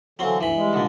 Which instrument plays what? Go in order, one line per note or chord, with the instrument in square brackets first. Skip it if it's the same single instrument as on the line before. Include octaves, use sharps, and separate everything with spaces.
[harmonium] D3 E3 [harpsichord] F#3 C4 F5
[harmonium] D2 G2 [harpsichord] E3 B5
[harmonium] G3 G#3
[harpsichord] A#2 D3